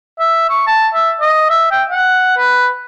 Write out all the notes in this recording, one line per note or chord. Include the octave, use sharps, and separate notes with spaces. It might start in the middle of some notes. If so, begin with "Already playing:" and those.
E5
C#6
A5
E5
D#5
E5
G5
F#5
B4